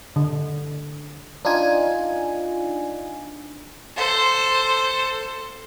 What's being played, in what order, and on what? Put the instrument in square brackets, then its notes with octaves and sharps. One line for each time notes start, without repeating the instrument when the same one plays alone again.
[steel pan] D3
[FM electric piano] D4 D#4 F4 G#5
[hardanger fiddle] A4 C5